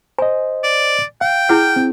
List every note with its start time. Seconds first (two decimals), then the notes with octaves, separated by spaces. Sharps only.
0.19 C5 D#5 G#5
0.64 D5
1.21 F5 G5
1.49 E4 G#4 F#5 F6 G6
1.76 C4